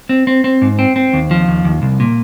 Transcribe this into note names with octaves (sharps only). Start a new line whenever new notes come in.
C4
C4
C4
G#2
C4
C4
D#2
F3
D#2
D#2
C2
A#2